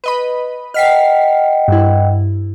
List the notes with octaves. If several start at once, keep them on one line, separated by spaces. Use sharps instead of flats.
B4 D#5 B5
D#5 F#5 G5 F6 B6 C7
G2 E4